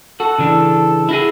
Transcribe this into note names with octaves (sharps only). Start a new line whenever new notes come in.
F#4 A4
C#3 E3 D4
E4 F#4 G#4